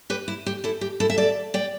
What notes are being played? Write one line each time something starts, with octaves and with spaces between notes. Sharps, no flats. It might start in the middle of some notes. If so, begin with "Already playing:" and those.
G4 B4
E4
G4
E4 A4
G4
E4 A4
E5
A4 D5
D5 G5